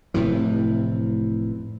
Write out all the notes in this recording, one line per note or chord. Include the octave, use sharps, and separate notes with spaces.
F1 A2 C3 E3